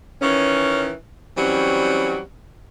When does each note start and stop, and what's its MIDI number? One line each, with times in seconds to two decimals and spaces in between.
0.22 0.91 51
0.22 0.91 52
0.22 0.91 61
1.37 2.20 52
1.37 2.20 54
1.37 2.20 55
1.37 2.20 60
1.37 2.20 61